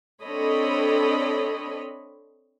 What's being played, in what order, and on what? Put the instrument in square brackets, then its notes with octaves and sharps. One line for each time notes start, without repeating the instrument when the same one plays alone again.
[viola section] C4 D4 A4 C#5 D#5 B5